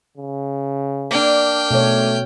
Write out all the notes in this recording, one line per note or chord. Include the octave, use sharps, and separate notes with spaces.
C#3
A#3 D4 G5 F6
B2 A3 C#5